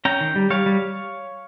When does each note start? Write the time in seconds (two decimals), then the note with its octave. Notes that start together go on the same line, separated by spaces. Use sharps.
0.05 C#4 G5 A#5
0.21 D#3
0.36 G3
0.50 G3 C#5 F5
0.66 G3